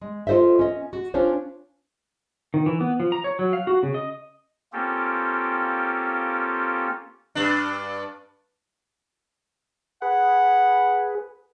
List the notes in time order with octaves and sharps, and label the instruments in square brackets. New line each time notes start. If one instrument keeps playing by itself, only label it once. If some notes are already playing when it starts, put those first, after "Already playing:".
[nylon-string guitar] G#3
F4 A4 C5 D#5 E5
C#4 D#5
F#4
C#4 D4 F4 C5 C#5
[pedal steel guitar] D#3
E3
B3
F3
A#5
C#5
F#3
F5
F#4
C#3
D#5
[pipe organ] A#3 C4 C#4 F4 G4 A4
[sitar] G2 D4
[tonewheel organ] G#4 B4 [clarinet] F#5